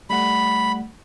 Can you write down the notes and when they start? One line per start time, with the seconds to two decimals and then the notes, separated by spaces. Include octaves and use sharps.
0.10 G3 A3 F#5 B5